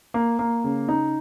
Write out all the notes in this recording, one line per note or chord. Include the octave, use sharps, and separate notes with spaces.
A#3
A#3
C#3
D#4